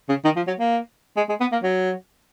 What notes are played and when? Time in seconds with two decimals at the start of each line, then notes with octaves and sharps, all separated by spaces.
0.09 C#3
0.24 D#3
0.36 F3
0.47 F#3
0.59 A#3
1.17 G#3
1.29 G#3
1.41 B3
1.52 A#3
1.63 F#3